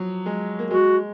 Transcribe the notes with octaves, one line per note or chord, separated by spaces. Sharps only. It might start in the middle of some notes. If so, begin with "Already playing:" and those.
Already playing: F3 F#3
G#3
A#3
G#3 F#4